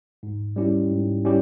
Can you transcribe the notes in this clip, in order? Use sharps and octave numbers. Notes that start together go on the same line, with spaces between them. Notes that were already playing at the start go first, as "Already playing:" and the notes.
G#2
G3 C#4 E4 G4
G#2
G3 C#4 E4 G4